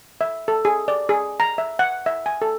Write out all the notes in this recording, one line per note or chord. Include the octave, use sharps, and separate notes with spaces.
E5
A4
G#4
D5
G#4
A#5
E5
F#5
E5
G#5
A4